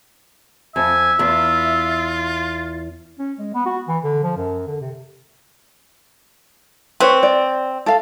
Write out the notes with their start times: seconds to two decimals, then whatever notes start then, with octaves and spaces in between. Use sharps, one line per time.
0.76 F2 E5 G#5
1.19 E2 F4
3.19 C#4
3.39 G#3
3.54 B3
3.66 F#4
3.88 E3
4.04 D3
4.23 F3
4.37 F#2
4.67 D3
4.81 C3
7.00 C4 B4 C#5
7.23 D5
7.86 A4 F5